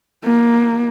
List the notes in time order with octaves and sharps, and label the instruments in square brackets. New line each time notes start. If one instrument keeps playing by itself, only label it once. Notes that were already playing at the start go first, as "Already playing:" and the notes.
[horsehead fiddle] A#3